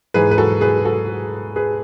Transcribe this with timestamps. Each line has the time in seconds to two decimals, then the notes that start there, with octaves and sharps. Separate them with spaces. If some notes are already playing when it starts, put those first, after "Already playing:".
0.14 G#2 E3 G#4 B4
0.31 B4
0.38 F#4 A4
0.61 G#4 B4
0.85 F#4 A4
1.56 G#4 B4